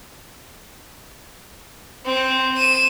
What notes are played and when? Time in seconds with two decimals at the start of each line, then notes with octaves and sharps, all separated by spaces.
2.06 C4
2.57 D#7 E7